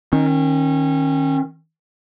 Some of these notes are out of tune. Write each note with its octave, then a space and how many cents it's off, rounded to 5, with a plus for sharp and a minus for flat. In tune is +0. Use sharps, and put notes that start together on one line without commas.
D#3 +0 C#4 -30